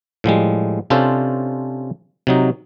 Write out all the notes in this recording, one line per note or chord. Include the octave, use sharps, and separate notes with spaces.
A2 F3 G3 G#3
C3 C#4 D4 F4 A4 C5
C3 F#3 D#4